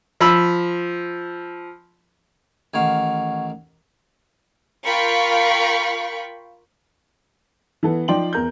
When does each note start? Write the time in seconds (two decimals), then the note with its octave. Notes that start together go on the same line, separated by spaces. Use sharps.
0.21 F3 B5 E6
2.74 A1 D#3 F5 F#5 C#6 G#6
4.85 F4 A#4 F5 G5 B5 C#6
7.83 E3 B3 A4
8.08 F3 D#4 D5 G5 C6 F#7
8.33 E2 A#4 G6